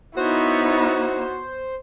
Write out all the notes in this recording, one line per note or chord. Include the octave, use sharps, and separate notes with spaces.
B3 D#4 E4 F#4 C5 C#5